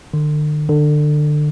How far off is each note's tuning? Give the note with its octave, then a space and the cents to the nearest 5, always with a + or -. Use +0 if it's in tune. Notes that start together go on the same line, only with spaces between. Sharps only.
D3 +40
D3 +25